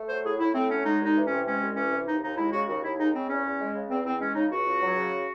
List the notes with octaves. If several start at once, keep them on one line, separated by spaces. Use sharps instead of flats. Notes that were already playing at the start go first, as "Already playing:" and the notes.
Already playing: A3
F#3 C5
A2 G#4
A2 E4
A3 C4
F#3 C#4
G#3 D#4
C2 D#4
E3
C3 C#4
G#3 C#4
C2
E3 C#4
C3
D#2 D#4
D#2 D#4
G#3 E4
C#3 F#4
D#2 F#4
D#2 E4
G#3 D#4
C#3 C4
E2 C#4
E2
G#3
C#3
E2 C4
E2 C4
G#3 C#4
C#3 D#4
C#2 F#4
C#2
F#3
C#3